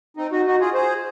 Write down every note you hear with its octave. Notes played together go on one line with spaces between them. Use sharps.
C4 D#4
D#4 F#4
D#4 F#4
F4 G#4
G#4 C5